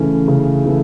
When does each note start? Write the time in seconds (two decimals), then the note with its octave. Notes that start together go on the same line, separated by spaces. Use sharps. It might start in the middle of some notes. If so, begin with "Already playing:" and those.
Already playing: C#3 E3 A3 C#4
0.28 C#3
0.65 E3 A3